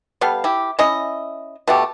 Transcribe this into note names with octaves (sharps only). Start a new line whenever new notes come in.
G3 B3 A4 F5
E4 G4
C#4 E4 D#5
B2 A3 G4